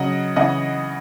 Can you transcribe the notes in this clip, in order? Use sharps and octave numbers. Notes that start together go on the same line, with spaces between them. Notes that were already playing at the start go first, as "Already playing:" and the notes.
Already playing: C#3 F#3 D#5 F#5
C#3 E3 D#5 F#5